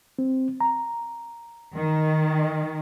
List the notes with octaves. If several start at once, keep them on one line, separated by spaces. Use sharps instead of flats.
C4
A#5
D#3